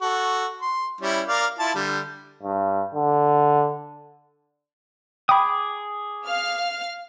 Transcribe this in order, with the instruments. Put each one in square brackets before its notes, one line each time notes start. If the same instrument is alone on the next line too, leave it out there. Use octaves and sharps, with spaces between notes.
[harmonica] F#4 A4
C6
G3 C#4 E4
A#4 D5 F5
E4 F4 A5
D3 G3
[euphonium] G2
D3
[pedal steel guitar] G#4 D6 D#6 [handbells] G5 B5
[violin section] F5 F6